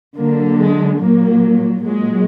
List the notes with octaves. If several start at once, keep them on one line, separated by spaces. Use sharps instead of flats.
D3 F#3 A#3
G#3
F#3 A#3
A#2
A#2 F#3 G#3